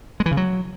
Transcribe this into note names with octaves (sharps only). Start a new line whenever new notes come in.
G#3
E3
C#3
F#3